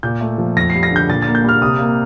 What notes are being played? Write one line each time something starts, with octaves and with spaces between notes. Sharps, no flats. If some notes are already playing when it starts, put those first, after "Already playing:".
A#2 G6
A3
F3
F2 A#6
C7
G3
A#6
D3
G6
A#2 A6
A6
A#3
G6
G3 F6
C3 D#6
A#3